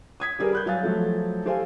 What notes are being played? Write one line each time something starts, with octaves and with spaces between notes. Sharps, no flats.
D#6 G#6 B6
G3 G4 G#4 A#4 B4 D5
B5 F#6 G6
F#3 F5 G#5 A6
F3 F#3 A3
G4 A4 C5 F5 G#5